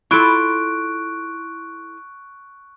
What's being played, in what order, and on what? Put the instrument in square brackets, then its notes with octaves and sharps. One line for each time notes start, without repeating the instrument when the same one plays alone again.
[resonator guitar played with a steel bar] E4 F4 A4 [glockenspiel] C#6 F#6 D7